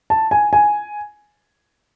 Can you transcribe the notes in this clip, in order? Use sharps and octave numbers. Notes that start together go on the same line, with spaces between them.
A5
G#5
G#5